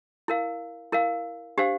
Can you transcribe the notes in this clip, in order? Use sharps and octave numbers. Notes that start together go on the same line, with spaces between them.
E4 A#4 F5
E4 A#4 F5
D4 G4 C5 F5